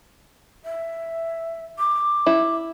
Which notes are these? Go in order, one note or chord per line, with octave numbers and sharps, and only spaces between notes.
E5
D6
E4